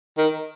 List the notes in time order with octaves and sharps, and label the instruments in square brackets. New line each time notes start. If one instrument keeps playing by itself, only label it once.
[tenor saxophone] D#3